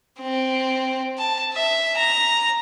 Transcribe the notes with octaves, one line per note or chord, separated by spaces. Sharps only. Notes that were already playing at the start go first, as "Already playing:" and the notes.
C4
A5
E5
A#5